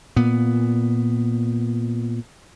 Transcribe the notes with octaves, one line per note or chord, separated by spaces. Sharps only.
A#2 B3